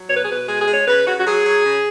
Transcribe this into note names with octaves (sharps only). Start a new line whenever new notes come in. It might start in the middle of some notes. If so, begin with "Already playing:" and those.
Already playing: F#3
B2 C#5
B4
G#4
B2 B4
G#3 G#4
G#4
G#3
C#5
C#3 B4
C#3 F#4
F#4
F#3 G#4
F#3
C#3